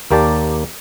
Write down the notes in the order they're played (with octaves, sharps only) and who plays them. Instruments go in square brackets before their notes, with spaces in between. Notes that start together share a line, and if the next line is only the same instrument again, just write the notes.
[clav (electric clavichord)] D#2 A#3 G4 D5 A5